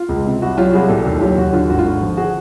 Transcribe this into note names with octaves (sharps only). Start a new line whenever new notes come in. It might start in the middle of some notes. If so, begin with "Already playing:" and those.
Already playing: F4
C#2
C3
C2 F#4
F#3 F4 G4
C2 F#4 G#4
A#2 G4 A4
D#2
F#3 F4 G4
D#2 F#4
D3 F4
G#1 F#4
F4
D3 F#4
F3
F#4 G#4